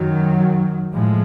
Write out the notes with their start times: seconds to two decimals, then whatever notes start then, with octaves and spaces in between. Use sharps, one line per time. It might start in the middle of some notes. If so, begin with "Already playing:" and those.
Already playing: F#2 D#3 F#3
0.92 A2 F3 G#3